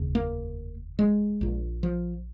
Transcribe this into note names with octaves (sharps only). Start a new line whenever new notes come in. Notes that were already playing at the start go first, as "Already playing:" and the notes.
Already playing: F1 D#2 C#3
A#3
G#3
A#1 A#2
F3